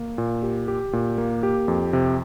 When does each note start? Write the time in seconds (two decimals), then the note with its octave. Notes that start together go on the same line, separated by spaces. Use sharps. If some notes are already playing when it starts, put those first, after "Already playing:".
Already playing: A#3
0.18 A#2
0.43 G4
0.68 G4
0.93 A#2
1.18 A#3
1.43 G4
1.68 F2
1.93 C3